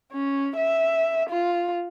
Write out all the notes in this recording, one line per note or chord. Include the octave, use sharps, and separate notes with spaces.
C#4
E5
F4